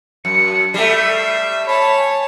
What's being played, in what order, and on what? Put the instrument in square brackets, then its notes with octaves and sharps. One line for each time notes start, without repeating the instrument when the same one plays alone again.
[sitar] F#2 [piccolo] C#7
[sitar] G3 A3 [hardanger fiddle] E5 [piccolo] C7
[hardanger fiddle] C#5 A5 [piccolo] B5
[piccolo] G#5